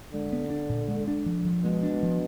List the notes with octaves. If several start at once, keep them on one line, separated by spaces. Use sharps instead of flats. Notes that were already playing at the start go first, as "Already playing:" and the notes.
D3 G#3
B3
D4
A#2
G#3
D4
F3
F3
B2 G#3
D4
F3